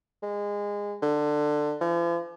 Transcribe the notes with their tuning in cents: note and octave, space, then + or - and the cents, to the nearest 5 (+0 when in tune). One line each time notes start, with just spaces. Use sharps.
G#3 -20
D3 +20
F3 -45